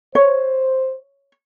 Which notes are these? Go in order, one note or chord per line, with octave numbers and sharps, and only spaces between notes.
C5 C#5